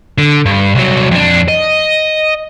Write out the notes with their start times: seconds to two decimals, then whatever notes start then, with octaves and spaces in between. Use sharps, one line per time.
0.18 D3
0.46 G2
0.75 C2 F#3
1.11 F2 D4
1.48 D#5